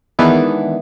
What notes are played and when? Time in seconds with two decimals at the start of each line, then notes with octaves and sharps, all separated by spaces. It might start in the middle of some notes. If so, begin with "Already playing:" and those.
0.19 D#3 E3 G#3 B3 D4 E4